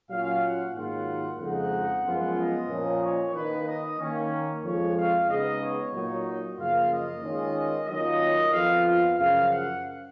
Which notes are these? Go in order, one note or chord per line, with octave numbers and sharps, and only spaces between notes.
A#2 F#3 C#4 F4 F5
F#5
G#2 D#3 F#3 A#3 F4 F#5
F2 C#3 F3 G#3 D#4 F#5
F#2 F3 G#3 B3 F4
D#5
A#2 F3 A#3 C#4
C#5
D#3 A#3 D#4 B4
D#5
D#3 A#3 C#4
F2 F3 G#3 C#5
F5
C#3 G#3 B3 D#4 D#5
C#5
A#2 F#3 A#3 D#4
F#2 C#3 F3 A#3 F4 F5
D#5
D#3 G#3 C#4 F4
D#3 F#3 A#3 C#4 F4 D#5
F2 F3 B3 F4 F5
F5
F#2 C#3 F3 F5
F#5